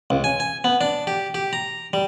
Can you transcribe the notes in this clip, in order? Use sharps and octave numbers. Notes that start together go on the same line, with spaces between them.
C#2
G#5
G#5
B3
D4
G4
G4
A#5
G3